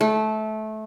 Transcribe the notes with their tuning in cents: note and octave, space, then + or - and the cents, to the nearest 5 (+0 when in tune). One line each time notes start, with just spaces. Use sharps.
A3 -20